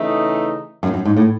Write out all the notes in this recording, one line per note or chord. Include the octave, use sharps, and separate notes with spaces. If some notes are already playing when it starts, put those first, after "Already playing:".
Already playing: C#3 E3 A3 D#4
F#2
F#2
G#2
A2